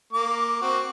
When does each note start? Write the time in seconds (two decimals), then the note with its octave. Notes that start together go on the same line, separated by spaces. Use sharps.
0.13 A#3 D6
0.62 C4 F#4